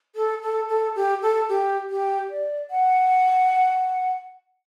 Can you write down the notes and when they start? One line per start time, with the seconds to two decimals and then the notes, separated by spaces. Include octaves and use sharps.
0.15 A4
0.42 A4
0.68 A4
0.95 G4
1.22 A4
1.48 G4
1.89 G4
2.30 D5
2.70 F#5